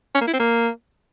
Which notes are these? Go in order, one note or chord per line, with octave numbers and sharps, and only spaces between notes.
C#4
A#3
E4
C4
A#3